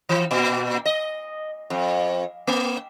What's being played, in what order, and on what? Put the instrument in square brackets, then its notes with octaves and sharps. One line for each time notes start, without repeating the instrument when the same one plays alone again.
[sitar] E3
A#2
D#5
F2
A#3